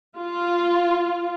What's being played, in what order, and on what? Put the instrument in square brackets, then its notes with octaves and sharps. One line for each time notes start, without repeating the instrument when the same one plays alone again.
[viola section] F4